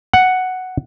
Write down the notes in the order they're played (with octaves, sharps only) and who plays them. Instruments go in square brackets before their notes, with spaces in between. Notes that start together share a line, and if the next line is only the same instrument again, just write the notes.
[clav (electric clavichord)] F#5